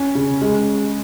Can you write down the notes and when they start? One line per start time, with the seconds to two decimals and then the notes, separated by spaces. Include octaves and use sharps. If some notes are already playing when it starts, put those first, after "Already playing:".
Already playing: C#4
0.15 C#3
0.41 G#3